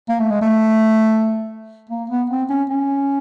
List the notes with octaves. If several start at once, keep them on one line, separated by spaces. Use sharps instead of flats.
A#3
A3
G#3
A3
A#3
B3
C4
C#4
C#4